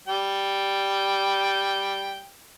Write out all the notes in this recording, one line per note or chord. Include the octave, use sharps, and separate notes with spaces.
G3 G5